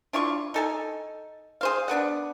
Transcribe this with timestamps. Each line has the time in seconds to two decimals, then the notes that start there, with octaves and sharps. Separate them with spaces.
0.13 D4 E4 F4 C#6
0.54 D#4 A4 G#5
1.61 G#4 C5 F5
1.88 B3 D4 B4 F#5